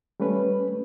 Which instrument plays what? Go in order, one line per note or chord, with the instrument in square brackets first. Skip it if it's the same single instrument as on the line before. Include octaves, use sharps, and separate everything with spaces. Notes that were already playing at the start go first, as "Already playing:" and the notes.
[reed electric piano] G3 A3 C#4 B4